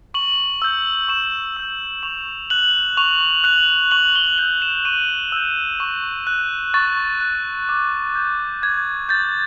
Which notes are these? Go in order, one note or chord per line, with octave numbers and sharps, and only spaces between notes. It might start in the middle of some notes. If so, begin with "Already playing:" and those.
C#6 F#7
E6 G6
C#6 E7
E6 G6
C#6 F7
F#6 F#7
C#6 F7
F#6 F#7
C#6 F#7
G7
E6 G6 F#7
E7
C#6 D#7
E6 G6
C#6
F#6
C#6 A6
F#6
D6
G6
D6 G#6
G6 A6